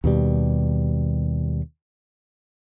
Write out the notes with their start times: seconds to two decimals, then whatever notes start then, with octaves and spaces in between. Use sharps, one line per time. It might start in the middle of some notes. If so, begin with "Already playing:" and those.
0.04 D#2 B2 G3